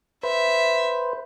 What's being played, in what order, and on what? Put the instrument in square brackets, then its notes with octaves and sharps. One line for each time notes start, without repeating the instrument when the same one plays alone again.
[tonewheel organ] B4 C5 [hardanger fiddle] E5